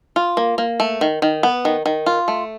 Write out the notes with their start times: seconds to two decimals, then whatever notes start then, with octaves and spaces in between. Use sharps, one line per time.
0.16 F4
0.37 A#3
0.58 A#3
0.80 A3
1.01 D#3
1.22 D#3
1.43 B3
1.65 D#3
1.86 D#3
2.06 F4
2.28 A3